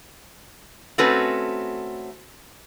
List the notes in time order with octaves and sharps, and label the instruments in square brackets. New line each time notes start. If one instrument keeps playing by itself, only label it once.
[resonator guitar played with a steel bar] A3 C4 C#4 F#4 A4 B4